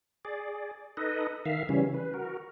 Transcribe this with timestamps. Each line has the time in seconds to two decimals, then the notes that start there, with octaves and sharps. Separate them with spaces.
0.25 G#4 D5
0.97 D#4 A4 B4 D#5
1.46 D#3 E5 F5
1.69 C#3 E3 G3 C#4
1.94 B4
2.14 F#4 A#4